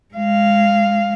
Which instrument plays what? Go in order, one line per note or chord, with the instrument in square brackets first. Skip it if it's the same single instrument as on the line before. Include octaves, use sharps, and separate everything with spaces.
[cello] G#3 F5